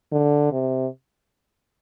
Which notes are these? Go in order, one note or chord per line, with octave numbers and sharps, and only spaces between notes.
D3
C3